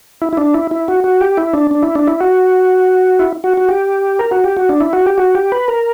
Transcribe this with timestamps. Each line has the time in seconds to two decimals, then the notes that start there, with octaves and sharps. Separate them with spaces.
0.22 E4
0.33 E4
0.37 D4
0.54 E4
0.71 E4
0.88 F#4
1.04 F#4
1.21 G4
1.37 E4
1.53 D4
1.71 D4
1.83 E4
1.95 D4
2.07 E4
2.20 F#4
3.19 E4
3.44 F#4
3.57 F#4
3.69 G4
4.19 A#4
4.31 F#4
4.44 G4
4.57 F#4
4.69 D4
4.80 E4
4.93 F#4
5.06 G4
5.18 F#4
5.35 G4
5.52 B4
5.68 A#4